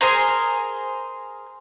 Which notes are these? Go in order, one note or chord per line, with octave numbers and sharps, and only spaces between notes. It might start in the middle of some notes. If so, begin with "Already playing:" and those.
G#4 A#4 C5 A#5